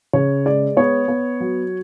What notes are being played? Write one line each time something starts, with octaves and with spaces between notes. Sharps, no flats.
C#3 C#5
G#3 D5
B3 C#5
B3
F#3